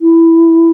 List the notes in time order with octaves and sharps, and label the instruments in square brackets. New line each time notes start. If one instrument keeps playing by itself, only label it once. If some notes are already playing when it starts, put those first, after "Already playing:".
[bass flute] E4